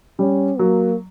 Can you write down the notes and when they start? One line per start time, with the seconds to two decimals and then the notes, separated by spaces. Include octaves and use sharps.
0.19 G3 C#4
0.59 F#3 A#3